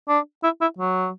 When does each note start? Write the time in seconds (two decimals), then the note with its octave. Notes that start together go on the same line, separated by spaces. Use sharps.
0.09 D4
0.43 E4
0.61 E4
0.78 F#3